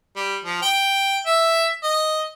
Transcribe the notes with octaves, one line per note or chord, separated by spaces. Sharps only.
G3
F3
G5
E5
D#5